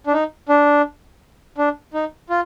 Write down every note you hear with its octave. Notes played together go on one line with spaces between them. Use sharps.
D4
D#4
D4
D4
D#4
F4